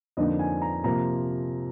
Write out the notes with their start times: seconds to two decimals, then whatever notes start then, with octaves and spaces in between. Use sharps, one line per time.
0.17 F2 D3 F3 A#3 D#4 D#5
0.39 G#5
0.62 A#5
0.84 C3 F3 A#3 A#5